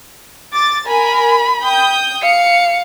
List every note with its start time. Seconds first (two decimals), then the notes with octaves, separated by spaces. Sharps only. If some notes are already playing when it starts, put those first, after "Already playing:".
0.53 D6 A6
0.87 A#4 G#5 B5
1.62 G5 D#6 G6
2.23 F5 C#7